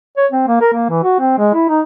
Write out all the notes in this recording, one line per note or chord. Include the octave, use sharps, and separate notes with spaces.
C#5
C4
A#3
A#4
A#3
E3
F#4
C4
G#3
E4
D#4